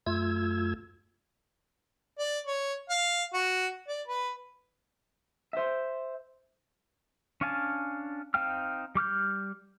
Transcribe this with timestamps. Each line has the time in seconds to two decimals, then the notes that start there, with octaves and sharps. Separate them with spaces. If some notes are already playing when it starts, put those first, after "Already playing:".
0.07 F#2 A3 F4 E6 G#6
2.19 D5
2.47 C#5
2.90 F5
3.34 F#4
3.88 D5
4.08 B4
5.53 C5 E5
7.41 C#4 D4 F5 G#5 A5
8.34 C4 D#4 F5 G5 F6
8.95 G3 D6 F6 G6